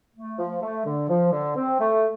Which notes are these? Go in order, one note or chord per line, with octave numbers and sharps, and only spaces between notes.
A3
F3
A3
D3
F3
D3
C4
A3